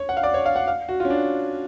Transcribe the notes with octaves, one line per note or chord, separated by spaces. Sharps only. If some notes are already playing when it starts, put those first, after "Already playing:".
Already playing: C#5
F#5
F5
D5
C#5
F5
F#5
F5
F#4
F4
C#4
D4